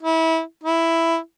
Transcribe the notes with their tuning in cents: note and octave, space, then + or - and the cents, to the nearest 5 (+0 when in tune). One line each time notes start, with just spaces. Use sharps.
E4 -25
E4 +5